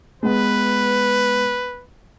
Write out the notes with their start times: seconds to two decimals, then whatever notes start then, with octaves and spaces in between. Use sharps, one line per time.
0.23 G#3 B3 B4